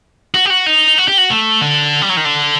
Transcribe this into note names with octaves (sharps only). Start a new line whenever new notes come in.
F#4
G4
F#4
D#4
F#4
G4
F#4
A3
D3
G3
F#3
D#3
D3